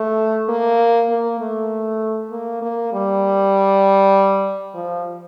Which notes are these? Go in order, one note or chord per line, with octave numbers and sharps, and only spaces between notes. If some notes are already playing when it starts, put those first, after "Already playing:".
Already playing: A3
A#3
A#3
A3
A#3
A#3
G3
F3